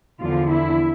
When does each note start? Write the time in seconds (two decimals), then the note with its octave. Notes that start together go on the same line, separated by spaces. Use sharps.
0.22 E2 D3 F3 F4
0.52 E4